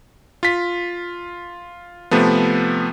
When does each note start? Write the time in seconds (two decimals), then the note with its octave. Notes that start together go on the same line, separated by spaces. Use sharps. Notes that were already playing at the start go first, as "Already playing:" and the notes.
0.43 F4 B6
2.11 C3 F3 A3 B3